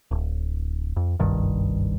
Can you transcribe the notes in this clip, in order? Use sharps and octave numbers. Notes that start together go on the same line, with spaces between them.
D1
F2
F#1 C2 G2 D#3